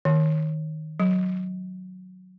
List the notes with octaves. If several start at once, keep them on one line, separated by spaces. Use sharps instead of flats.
D#3
F#3